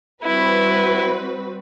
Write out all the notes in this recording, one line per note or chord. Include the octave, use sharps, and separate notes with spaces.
G3 C4 E4 F#4 B4